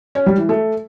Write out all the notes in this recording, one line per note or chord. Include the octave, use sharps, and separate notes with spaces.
C#4
G3
E3
A3